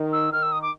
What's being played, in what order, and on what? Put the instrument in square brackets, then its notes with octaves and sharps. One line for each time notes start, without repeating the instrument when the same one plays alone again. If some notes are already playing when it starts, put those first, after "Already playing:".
Already playing: [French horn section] D#3
[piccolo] E6
[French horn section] D#3 [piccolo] F6
[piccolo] E6
D#6
D6